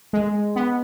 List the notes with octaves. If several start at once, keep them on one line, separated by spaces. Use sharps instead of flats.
G#3
B3